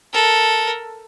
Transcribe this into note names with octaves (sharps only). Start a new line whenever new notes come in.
A4 A#4